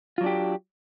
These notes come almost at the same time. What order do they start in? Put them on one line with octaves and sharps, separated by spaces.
F4 F#3 D4 G4